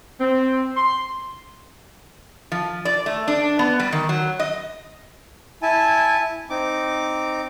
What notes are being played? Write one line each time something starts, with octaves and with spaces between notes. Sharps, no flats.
C4
C6
F3
D5
A3
D4
B3
G3
D#3
F#3
D#5
E4 G#5 A5
C4 D#4 D6